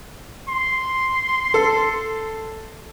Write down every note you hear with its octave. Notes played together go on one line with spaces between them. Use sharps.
C6
A4